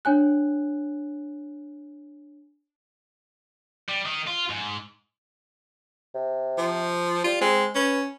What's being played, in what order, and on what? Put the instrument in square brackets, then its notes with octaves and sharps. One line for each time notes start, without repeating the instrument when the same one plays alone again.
[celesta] D4 C#5 G#5 F#6
[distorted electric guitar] G3
D#3 D#4
F4
G#2
[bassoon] C3
[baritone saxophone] F3
[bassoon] G3 [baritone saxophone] F4
[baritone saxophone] G#3 [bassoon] C4
[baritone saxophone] C#4 [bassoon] B4